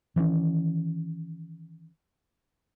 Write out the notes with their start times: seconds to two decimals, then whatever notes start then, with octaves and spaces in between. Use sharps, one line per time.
0.16 D#3 E3 G3 C#4